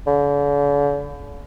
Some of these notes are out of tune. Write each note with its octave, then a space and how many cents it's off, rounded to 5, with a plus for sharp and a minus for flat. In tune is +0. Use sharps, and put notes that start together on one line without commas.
D3 -45